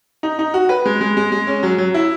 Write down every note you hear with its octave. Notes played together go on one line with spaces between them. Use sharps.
D#4
D#4
F#4
B4
G#3
G#3
G#3
G#3
C#4
F#3
F#3
E4